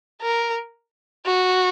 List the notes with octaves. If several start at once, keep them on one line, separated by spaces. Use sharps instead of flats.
A#4
F#4